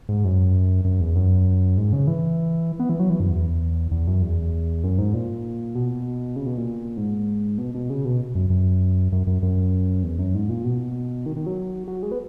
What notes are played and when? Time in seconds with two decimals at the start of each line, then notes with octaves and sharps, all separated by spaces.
0.09 G#2
0.24 F#2
0.85 F#2
1.00 E2
1.16 F#2
1.77 G#2
1.93 C#3
2.07 E3
2.80 B3
2.89 E3
2.99 F#3
3.10 E3
3.20 F#2
3.30 E2
3.91 E2
4.07 F#2
4.22 E2
4.84 F#2
4.99 G#2
5.14 A#2
5.75 B2
6.36 C#3
6.46 B2
6.57 A#2
6.97 G#2
7.58 B2
7.75 B2
7.90 C#3
8.05 B2
8.35 F#2
8.50 F#2
9.12 F#2
9.27 F#2
9.43 F#2
10.03 E2
10.19 F#2
10.35 G#2
10.49 A#2
10.64 B2
11.26 D#3
11.37 D#3
11.46 F#3
11.88 F#3
12.03 G#3
12.12 B3